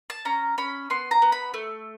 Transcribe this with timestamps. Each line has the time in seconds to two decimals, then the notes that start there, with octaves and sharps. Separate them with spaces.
0.10 A5
0.25 C#4 A#5
0.58 C#4 B5
0.90 B3 C6
1.11 A#5
1.22 B3
1.32 B5
1.54 A3